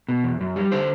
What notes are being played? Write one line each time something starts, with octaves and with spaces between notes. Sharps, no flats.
B2
E2
F#2
G3
D3 C5